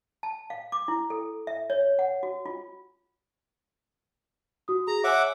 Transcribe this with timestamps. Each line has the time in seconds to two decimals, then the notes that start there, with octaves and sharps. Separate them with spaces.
0.23 A5
0.50 F5
0.72 D6
0.88 E4
1.10 A4
1.47 E5
1.70 C#5
1.99 F#5
2.23 F#4
2.46 F4
4.68 F#4 D#6
4.87 G#4 A#5
5.04 C#5 E5 F#5 G#5 D6